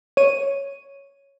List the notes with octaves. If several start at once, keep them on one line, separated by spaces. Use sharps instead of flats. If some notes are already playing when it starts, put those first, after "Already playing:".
C#5 D#7